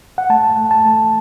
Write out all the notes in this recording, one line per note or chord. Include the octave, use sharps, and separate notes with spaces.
F#5
A3 A5
A3
A5
A3